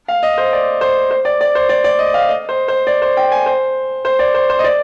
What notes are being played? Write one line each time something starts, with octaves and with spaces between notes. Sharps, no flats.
F5
D#5
C5
D5
C5
C5
D5
D5
C5
D5
D5
D#5
F5
D#5
C5
C5
D5
C5
G5
G#5
C5
C5
D5
C5
C5
D#5
D5